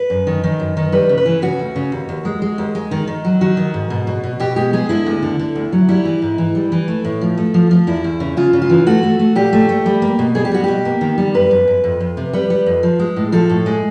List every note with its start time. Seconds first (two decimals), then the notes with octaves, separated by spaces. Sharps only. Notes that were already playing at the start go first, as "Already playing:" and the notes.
Already playing: B4
0.10 F#2
0.27 D#3
0.44 D#3
0.59 F#2
0.77 D#3
0.92 G3 B4
1.09 C#3
1.17 B4
1.26 E3
1.42 C#3 F#4
1.59 D2
1.76 C#3
1.92 D#2
2.09 D#2
2.25 G#3
2.42 G#3
2.58 D#2
2.75 G#3
2.91 D#3
3.07 D#3
3.25 F#3
3.41 D#3 F#4
3.57 D#3
3.74 G#2
3.90 B2
4.07 B2
4.24 B2
4.40 B2 G4
4.56 G#3 G4
4.73 G#3 G#4
4.89 D3 E4
5.06 D2
5.22 D3
5.39 D3
5.55 D2
5.72 F#3
5.89 G3 E4
6.05 E3
6.22 G#2
6.38 E3
6.55 G3
6.72 E3
6.88 A3
7.04 A2
7.21 F3
7.37 A3
7.54 F3
7.71 F3
7.87 E2 E4
8.04 E2
8.20 C#3
8.37 C#3 F4
8.53 C#3
8.62 F4
8.70 E3
8.86 A3 F#4
9.03 A3
9.19 A3
9.35 A#2 G4
9.53 A3
9.69 A3
9.86 G3
10.02 A#3
10.19 B2
10.35 G3 G#4
10.45 G4
10.52 G3 F#4
10.64 B2 G4
10.85 A#3
11.01 D#3
11.18 G3
11.34 F#2 B4
11.51 F#2
11.68 F#2
11.84 F2
12.00 F2
12.17 C3
12.33 G3 B4
12.50 G3
12.66 F2
12.83 F3
12.99 G#3
13.16 A2
13.32 F3 A4
13.49 A2
13.66 G#3